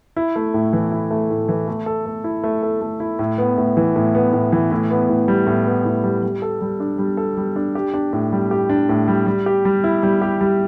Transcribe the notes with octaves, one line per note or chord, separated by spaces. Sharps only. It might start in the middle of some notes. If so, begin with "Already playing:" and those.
E4
A3
A2
E3
E4
A3
A2
E3
A3
A4
A3
E4
A3
A4
A3
E4
A2
B3
A2
E3
A2
B3
A2
E3
A2
B3
A2
G3
A2
B3
A2
G3
G3
A4
G3
D4
G3
A4
G3
D4
G4
D4
A2
G3
G4
D4
A2
G3
G3
G4
G3
E4
G3
G4
G3